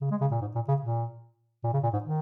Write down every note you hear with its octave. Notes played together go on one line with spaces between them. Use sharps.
C#3
G#3
C#3
A#2
G#2
A#2
C#3
A#2
A#2
C#3
A#2
G#2
D#3